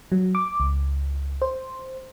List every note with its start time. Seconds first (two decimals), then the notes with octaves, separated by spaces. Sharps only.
0.12 F#3
0.35 D6
0.60 C#2
1.42 C5